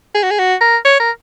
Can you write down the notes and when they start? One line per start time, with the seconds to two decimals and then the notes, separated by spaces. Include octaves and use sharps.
0.15 G#4
0.23 F#4
0.31 G#4
0.39 F#4
0.61 A#4
0.85 C#5
1.00 A#4